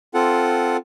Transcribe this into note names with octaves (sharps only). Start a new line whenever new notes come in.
C4 F4 A4 F#5